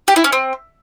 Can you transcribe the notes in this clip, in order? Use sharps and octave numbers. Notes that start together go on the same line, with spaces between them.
G4
E4
C#4
C4